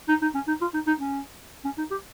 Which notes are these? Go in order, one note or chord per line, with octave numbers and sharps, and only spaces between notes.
D#4
D#4
C#4
D#4
F4
D#4
D#4
C#4
C#4
D#4
G4